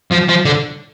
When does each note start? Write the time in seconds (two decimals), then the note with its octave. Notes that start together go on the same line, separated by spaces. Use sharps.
0.11 F3
0.28 F3
0.45 D3